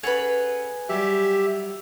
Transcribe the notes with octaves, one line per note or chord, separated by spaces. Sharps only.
C#4 G#4 A4 B4 F#5
F#3 G3 G4 E5